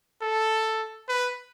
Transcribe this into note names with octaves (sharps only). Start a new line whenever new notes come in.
A4
B4